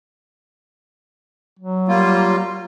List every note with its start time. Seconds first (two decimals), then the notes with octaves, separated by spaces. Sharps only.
1.59 F#3
1.88 G3 A#3 F4